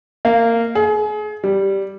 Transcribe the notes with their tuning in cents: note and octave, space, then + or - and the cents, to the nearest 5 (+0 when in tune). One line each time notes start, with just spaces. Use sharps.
A#3 -20
G#4 +30
G3 -5